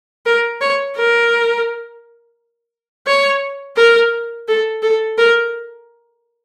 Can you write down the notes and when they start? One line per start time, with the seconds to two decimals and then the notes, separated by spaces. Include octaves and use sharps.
0.25 A#4
0.61 C#5
0.96 A#4
3.06 C#5
3.77 A#4
4.48 A4
4.82 A4
5.17 A#4